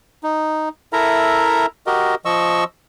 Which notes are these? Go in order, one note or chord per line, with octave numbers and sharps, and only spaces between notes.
D#4
E4 A4 A#4 E5 A#5
F#4 G4 A#4 D#5
F3 D#5 C#6 E6